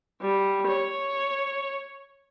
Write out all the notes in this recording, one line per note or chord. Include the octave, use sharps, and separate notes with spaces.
G3
C#5